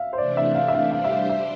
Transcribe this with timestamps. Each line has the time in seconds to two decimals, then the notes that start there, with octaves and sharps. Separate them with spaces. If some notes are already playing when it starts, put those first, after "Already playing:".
Already playing: E5 F5
0.13 C5
0.18 C3 E3 A3 D4 D5
0.37 E5
0.55 F5
0.68 E5
0.74 F5
0.92 G3 D4 G4 C5 F5
1.04 E5
1.11 F5
1.30 E5